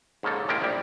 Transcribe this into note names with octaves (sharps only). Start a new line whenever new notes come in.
G#2 C#3 A#3 A4
G#3 A#3 E4 A#4 G5
A#1 G3